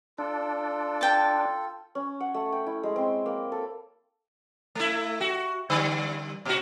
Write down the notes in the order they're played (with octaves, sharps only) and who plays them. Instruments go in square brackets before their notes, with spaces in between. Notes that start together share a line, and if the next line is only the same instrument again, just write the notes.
[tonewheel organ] D4 [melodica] F4 A4
[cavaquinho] G5 A5
[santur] C#4
F#5
A3
G5
E4
G#3
C4
A#3
A4
[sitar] A3 E4
F#4
D3 G3
A#2 F#4